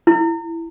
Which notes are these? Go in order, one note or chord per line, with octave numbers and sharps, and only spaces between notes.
E4